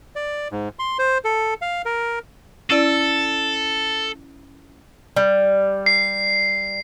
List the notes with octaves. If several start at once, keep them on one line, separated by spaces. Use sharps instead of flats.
D5
G#2
C6
C5
A4
F5
A#4
C#4 E4 A4 D5
G3
C7